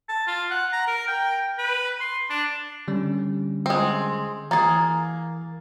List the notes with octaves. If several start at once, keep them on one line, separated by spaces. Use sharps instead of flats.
A5
F4
F#5
A#5
A#4
G5
B4
C6
D4
D3 G3 C#4
G#3 C4
E3 A#3 G#4 A6 C7